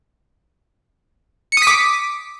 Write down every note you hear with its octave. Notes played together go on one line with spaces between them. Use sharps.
D6 D#6 B6 C#7